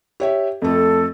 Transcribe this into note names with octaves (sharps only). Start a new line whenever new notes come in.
G4 C#5 E5
F2 A3 A4